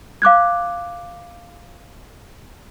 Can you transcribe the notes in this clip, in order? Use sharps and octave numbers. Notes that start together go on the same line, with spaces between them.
F5 D6 F#6 G#6